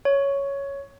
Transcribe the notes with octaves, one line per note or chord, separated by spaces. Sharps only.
C#5